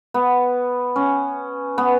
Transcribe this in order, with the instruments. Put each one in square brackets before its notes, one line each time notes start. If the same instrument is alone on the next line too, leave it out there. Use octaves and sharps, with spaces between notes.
[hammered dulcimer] B3
C#4
B3